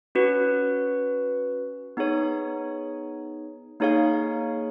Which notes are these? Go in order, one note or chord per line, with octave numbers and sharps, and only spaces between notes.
C#4 F#4 B4
B3 D#4 G#4 C#5
A#3 D#4 G#4 C#5 F5